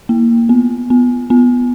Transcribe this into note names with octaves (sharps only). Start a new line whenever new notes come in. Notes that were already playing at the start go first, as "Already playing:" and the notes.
A#3
B3
B3
B3